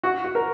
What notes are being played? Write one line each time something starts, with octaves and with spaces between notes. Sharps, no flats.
F#4
F#4
A#4